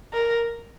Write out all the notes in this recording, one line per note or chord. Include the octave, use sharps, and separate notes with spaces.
A#4